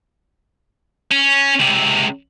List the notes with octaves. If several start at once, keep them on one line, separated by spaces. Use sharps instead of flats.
C#4
C#2 C3